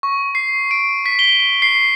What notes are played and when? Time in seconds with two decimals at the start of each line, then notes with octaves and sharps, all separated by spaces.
0.03 C#6
0.35 C7
0.71 D7
1.06 B6
1.19 G7
1.62 C7